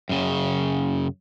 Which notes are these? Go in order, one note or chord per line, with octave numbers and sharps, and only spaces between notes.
F#2 C#3